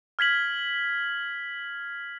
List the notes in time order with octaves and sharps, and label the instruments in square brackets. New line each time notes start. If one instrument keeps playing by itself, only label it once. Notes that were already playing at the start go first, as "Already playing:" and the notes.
[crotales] F6 G#6 B6 F#7